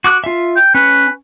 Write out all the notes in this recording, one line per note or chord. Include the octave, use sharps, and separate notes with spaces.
F#4 D6 F#6
F4 E5
G5
C#4 B4